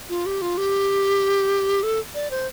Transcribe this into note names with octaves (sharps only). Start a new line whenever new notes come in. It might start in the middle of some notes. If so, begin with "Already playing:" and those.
F4
G4
F4
G4
A4
D5
C5